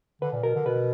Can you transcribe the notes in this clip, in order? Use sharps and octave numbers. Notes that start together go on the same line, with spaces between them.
D3 B4
A#2
B2 A#4
D3
B2 B4